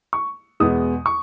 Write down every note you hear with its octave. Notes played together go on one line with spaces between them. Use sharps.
C#6
E2 B2 G#3 B3 D#6
C#6